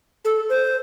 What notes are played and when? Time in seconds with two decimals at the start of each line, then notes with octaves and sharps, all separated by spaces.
0.25 A4
0.49 C5